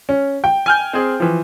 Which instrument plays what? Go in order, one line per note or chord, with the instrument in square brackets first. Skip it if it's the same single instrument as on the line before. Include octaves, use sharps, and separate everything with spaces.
[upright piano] C#4
G5
[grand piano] G#5 F6 G6
C4 G#4
E3 F3